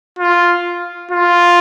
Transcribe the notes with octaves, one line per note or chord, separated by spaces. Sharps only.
F4
F4